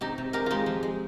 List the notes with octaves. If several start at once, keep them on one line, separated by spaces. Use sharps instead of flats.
C3 D#4 G4
C3
G#3 G4 A#4
G#3 D#4 F4 G4
F3
G#3